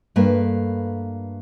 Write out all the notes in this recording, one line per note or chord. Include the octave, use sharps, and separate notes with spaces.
G2 A3 A#3 B4 F5